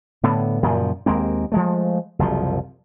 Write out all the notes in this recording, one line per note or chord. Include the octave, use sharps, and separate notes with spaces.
A2 D3 B3
F#2 A#2 C#3 F3
D#2 G#3 A#3 C4
F3 G#3 A3
F#1 C2 C3 F3